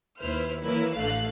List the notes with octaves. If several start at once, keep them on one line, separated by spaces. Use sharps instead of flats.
D#2 E4 B4 C5 F6
E3 F#3 A#3 E4 B4
A1 D3 A3 F5 F#6